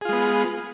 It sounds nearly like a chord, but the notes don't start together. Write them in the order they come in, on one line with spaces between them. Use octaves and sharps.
G#4 F4 G#3 B3